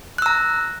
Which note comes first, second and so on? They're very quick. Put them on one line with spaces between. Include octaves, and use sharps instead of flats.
F#6 E6 A#5